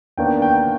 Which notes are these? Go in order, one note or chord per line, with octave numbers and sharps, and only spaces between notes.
D#2 D#3 B3 D4 G5
G5